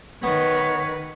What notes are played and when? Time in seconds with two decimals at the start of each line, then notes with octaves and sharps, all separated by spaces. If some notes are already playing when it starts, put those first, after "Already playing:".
0.23 D#3 B3 B4 C#5